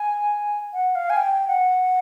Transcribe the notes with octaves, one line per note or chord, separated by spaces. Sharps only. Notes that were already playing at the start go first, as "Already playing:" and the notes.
Already playing: G#5
F#5
F5
G#5
G5
F#5